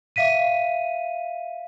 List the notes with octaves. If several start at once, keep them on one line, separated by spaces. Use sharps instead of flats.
E5 F5 B6 D#7